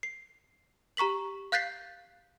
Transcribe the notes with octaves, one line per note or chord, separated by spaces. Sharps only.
C7
G4 A#5 C#6 B6 F#7
F5 F#6 G6 A6 B6 C7